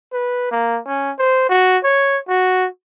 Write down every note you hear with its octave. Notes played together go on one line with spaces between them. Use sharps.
B4
A#3
C#4
C5
F#4
C#5
F#4